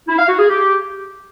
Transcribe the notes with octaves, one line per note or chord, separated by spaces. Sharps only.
E4
F5
F#4
G#4
G4